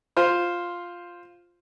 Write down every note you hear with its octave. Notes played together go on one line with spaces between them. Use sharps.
F4 C5